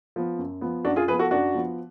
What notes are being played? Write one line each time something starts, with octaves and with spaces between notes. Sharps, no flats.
F3 B3
F#2
F3 B3
F#2 D4 F#4
F4 G#4
F3 B3 G#4 B4
F#4 A4
F#2 D4 F#4
F3 B3